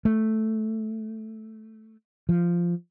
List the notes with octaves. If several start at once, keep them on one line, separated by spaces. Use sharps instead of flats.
A3
F3